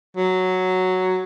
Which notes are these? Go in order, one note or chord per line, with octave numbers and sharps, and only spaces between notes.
F#3